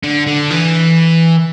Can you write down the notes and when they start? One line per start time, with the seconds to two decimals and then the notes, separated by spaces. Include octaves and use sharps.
0.04 D3
0.27 D3
0.50 E3